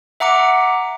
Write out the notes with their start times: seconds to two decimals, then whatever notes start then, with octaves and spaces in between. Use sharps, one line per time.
0.20 E5 F#5 A#5 D6 C#7